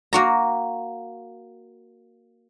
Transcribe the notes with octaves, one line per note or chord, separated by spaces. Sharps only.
A#3 F#4 A#5